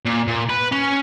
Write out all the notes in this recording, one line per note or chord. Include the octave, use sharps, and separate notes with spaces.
A#2
A#2
B4
C#4